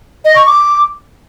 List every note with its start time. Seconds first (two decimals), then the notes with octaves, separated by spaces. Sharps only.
0.25 D#5
0.36 C#6
0.46 D6